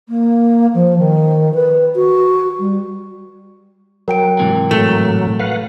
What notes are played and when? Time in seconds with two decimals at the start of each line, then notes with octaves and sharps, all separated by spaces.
0.08 A#3
0.73 F3
0.98 D#3
1.54 B4
1.95 F#4
2.58 G3
4.08 F#3 A#4 G5 D7
4.39 G#2 C3 E3
4.71 A2 F#3 A3
5.40 B4 F5 F#5